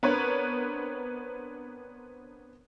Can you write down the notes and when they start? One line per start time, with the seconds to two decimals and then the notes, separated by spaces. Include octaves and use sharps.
0.03 B3 C4 D4 A#4 B4 C#5